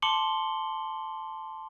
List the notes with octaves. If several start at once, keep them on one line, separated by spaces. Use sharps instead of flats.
A5 C6 D6 C#7 F#7 G7